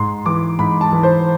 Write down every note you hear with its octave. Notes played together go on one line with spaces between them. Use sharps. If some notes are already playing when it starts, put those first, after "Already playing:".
Already playing: G#2 C6
E3 D6
G#2 B5
A5
E3
C5